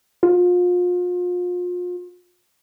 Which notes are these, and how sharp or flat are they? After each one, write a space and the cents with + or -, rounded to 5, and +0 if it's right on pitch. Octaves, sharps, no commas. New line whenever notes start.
F4 +35